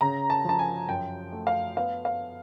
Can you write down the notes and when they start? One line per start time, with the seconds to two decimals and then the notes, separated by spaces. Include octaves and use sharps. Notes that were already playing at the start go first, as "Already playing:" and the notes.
0.01 C#3 A#5
0.30 A5
0.45 F3 A5
0.59 G#5
0.88 F#2 G5
1.32 A3
1.47 F5
1.77 B3 F5
2.05 F5